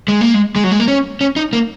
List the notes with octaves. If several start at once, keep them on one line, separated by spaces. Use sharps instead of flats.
G#3
A#3
G#3
G#3
F#3
G#3
A#3
C#4
C#4
D#4
A#3